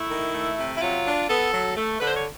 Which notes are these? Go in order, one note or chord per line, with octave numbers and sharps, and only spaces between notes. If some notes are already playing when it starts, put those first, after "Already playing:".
Already playing: A3 E4
D#3
A3
C3
E4
F#3 F4
D4
B3 A4
F#3
A3
D3 B4
C5
C#5